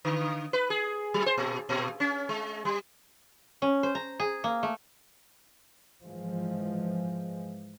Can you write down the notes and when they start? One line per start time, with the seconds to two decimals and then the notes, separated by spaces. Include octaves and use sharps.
0.05 D3
0.53 B4
0.70 G#4
1.14 F#3
1.26 C5
1.37 A#2
1.69 A#2
2.00 C#4
2.29 G#3
2.65 G3
3.62 C#4
3.83 C5
3.95 A#5
4.20 G#4
4.44 A#3
4.63 A3
6.03 G#2 E3 F3 G#3